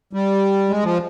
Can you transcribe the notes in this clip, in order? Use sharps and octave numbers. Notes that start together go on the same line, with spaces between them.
G3
G#3
F3